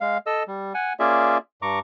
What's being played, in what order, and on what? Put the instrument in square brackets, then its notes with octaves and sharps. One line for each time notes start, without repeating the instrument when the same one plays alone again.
[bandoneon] G#3 F5
A4 D#5 E6
G3
F#5 G#5
A#3 C#4 F4 G#4 D5 E5
G2 A#5 C#6 D6